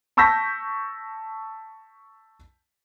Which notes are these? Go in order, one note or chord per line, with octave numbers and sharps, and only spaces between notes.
A5 C#6 E6 G6 A#6 B6